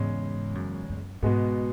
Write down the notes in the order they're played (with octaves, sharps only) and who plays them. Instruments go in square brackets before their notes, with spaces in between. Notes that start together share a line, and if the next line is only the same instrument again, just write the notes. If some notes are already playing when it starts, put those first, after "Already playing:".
Already playing: [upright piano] E2 C#3 G#3 C#4 [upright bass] G#2
[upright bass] F#2
F#2
[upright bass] G#2 [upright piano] B2 G#3 B3